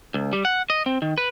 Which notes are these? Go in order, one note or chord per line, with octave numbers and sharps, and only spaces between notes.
C#2
G3
F#5
D#5
C4
D#3
B4